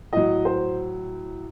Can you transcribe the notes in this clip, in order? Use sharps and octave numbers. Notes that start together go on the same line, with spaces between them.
A2 F#3 D#5
C5